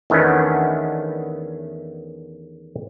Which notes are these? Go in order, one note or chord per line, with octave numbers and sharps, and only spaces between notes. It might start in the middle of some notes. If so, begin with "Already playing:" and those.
E2 D#3 A3 B3 C#4 D4